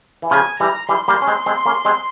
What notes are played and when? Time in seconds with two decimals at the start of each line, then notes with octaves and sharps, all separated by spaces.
0.22 E3
0.31 C#3 F3 G#5
0.59 E3 G3 A#5
0.89 E3 G3 C6
1.08 G3 A#3
1.22 C#4
1.27 G#3 C4
1.46 G#3 C4
1.66 A#3 C#4
1.85 G#3 C4